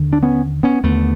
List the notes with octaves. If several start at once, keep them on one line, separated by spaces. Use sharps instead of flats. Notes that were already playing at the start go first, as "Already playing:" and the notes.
Already playing: D#2 D3
D4
B3 C#4
B3 C#4
D#2 D3 A3 B3